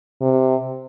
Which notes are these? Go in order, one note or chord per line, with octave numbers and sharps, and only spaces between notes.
C3